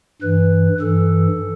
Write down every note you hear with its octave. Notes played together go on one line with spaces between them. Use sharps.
G2 E3 B4
G2 E3 A4